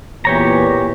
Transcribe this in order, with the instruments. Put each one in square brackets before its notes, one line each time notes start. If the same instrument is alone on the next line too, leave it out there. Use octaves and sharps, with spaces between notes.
[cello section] E2 A#2 [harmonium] E3 [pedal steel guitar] G4 C#5 A#5